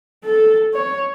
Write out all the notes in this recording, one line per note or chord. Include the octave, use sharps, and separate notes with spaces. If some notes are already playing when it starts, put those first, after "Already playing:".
A4
C#5